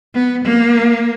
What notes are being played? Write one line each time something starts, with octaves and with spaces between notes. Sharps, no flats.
B3
A#3